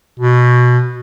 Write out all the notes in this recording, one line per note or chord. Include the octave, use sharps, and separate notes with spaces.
B2